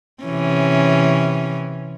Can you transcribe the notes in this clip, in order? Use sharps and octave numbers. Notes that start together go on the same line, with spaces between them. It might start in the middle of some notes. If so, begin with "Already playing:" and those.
C3 E3 C#4